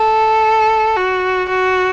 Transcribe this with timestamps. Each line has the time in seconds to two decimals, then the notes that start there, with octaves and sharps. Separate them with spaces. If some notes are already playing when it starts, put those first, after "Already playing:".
Already playing: A4
0.97 F#4
1.49 F#4